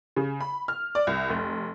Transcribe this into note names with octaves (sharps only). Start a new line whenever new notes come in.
C#3
B5
F6
D5
C2
F1